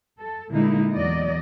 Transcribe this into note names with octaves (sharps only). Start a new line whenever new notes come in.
A4
A#2 D3 G#3 A#3 D#4 E4
E2 F#3 D5 D#5